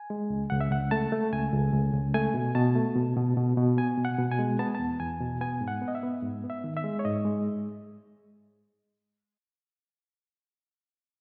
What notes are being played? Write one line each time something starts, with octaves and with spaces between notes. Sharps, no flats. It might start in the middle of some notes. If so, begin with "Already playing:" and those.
Already playing: G#5
G#3
C#2
C#2 F#5
E5
C#2 F#5
A3 A5
A3
C#2 G#5
C#2
C#2
C#2
A3 G#5
B2
B2 A5
A3
B2
B2
B2
B2
B3 G#5
B2
F#5
B2
G#5
G#3
B3 A5
E2 A5
E2 G#5
B2
B3 G#5
G#2
F#5
B3
D#5
E5
B3
G#2
B3
E5
D#3
E5
G#3
C#5
G#2 D#5
G#3